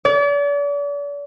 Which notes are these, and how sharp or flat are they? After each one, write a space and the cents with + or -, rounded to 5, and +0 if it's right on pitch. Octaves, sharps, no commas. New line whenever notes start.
D5 -40